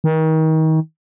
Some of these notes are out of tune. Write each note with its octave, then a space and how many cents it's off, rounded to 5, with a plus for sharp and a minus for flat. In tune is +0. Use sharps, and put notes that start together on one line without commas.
D#3 +30